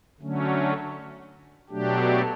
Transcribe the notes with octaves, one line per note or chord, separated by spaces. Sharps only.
D3 F#3 A3 C#4
B2 F#3 A3 D4 G4